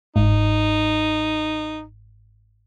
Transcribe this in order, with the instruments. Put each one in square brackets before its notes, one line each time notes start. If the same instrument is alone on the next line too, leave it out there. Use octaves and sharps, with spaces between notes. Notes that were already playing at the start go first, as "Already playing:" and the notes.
[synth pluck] G1 G#2 [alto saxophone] D#4